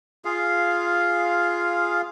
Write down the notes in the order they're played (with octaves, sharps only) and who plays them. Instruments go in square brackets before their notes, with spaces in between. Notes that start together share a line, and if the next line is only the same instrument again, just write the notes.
[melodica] F4 G#4 F5